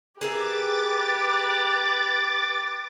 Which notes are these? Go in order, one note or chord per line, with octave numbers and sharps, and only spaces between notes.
G4 G#4 A#4 B4 E5 D6 A6